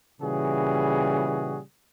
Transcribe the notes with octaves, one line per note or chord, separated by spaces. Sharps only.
A#2 C#3 E3 G3 F#4 G#4